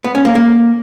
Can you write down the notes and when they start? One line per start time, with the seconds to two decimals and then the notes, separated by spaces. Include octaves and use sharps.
0.04 B3
0.15 C#4
0.25 A#3
0.35 A#3